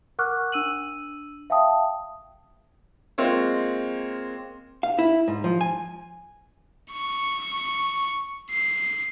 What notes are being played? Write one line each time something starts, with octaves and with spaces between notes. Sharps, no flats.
A#4 F#5 C#6 D6 F6 F#6
D4 E6 D#7 F#7
E5 F5 G5 A5 D#6
G#3 A#3 C4 F4 C#5
F5
E4
G#2
F3
G#5
C#6
C7